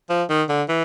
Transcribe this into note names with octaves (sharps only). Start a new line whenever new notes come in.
F3
D#3
D3
E3